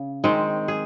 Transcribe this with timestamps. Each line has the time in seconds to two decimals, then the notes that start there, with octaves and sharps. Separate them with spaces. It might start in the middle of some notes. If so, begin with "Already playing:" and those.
Already playing: C#3
0.24 D#3 G#3 C4
0.68 G#4